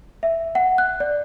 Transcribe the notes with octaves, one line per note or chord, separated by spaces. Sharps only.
E5
F#5
F#6
D5